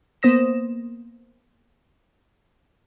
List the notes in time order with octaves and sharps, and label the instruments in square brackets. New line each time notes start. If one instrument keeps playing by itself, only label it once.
[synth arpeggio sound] A#3 B3 C5 D#6 A#6 E7